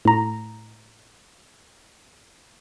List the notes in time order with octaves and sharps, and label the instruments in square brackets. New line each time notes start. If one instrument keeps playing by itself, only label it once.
[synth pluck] A2 A#5